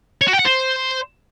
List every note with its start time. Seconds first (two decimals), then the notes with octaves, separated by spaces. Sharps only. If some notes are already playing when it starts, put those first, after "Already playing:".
0.21 C#5
0.27 F#4
0.33 G5
0.39 F#5
0.45 C5